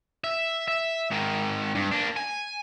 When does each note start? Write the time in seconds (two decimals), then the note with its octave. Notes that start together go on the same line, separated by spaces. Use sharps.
0.24 E5
0.68 E5
1.11 G#2 D#3
1.75 G2
1.91 A#3 D4
2.17 G#5